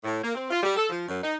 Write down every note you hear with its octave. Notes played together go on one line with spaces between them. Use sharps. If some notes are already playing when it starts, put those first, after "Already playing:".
A2
A#3
C4
F4
G3
A4
F3
F#2
D#4